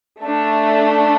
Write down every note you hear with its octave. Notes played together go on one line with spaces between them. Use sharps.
A3 D4 A4